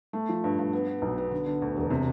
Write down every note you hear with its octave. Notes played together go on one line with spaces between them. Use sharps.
A3
F3
G2
G2
B3
B3
B1
B3
D3
D3
D2
E1
C3